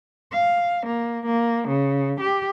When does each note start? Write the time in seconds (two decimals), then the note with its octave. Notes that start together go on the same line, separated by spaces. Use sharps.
0.33 F5
0.86 A#3
1.26 A#3
1.68 C#3
2.21 G4